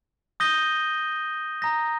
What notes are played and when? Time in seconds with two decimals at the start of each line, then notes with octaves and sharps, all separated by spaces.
0.40 D#6 G6 A#6 D#7 G7
1.62 A#5 D#6 A#6